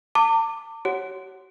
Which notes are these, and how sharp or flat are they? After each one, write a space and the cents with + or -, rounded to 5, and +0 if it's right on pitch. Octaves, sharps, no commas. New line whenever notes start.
A5 +45 D6 +0
G4 -45 C#5 +0 F#5 +5